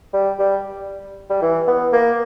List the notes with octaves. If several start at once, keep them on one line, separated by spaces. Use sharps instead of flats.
G3
G3
G3
E3
B3
A#3